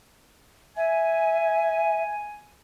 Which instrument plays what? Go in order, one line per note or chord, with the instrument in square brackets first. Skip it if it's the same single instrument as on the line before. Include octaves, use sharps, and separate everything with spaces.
[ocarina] E5 [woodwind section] G#5